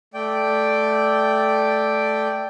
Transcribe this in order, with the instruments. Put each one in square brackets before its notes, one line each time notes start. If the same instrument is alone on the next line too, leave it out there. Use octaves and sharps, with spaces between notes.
[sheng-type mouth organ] A3 D5 G5